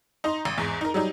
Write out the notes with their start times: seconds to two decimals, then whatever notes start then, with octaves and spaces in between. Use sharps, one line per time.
0.24 D#4 D#5 A#5 C6
0.45 G#1
0.58 E2 G#2
0.81 D#4 A#4
0.94 F#3 G3 D#4